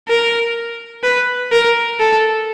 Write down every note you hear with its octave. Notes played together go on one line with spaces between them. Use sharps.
A#4
B4
A#4
A4